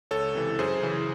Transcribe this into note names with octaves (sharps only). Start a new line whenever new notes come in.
C#2 A4 C#5
C3 E3
F#2 G#4 C5
C#3 E3